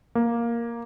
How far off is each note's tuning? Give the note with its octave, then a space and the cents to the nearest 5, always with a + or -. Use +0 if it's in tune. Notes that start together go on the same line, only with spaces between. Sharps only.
A#3 +5